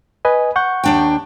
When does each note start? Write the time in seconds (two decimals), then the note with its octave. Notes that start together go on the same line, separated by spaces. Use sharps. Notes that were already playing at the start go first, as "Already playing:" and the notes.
0.25 B4 D#5 G#5
0.56 F#5 C#6 G6
0.84 D#2 D4 G5